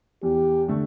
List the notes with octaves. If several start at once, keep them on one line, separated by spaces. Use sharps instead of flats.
E2 G4
D3 A3